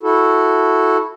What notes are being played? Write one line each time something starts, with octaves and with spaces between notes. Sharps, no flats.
E4 F#4 A4